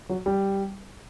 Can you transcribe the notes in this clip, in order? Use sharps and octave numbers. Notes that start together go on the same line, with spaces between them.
F#3
G3